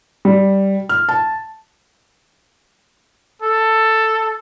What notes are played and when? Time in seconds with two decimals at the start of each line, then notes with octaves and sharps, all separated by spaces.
0.25 G3
0.89 F6
1.09 A5
3.42 A4